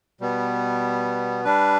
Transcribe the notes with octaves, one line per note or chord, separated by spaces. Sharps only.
B2 G3 B3
G3 D4 B4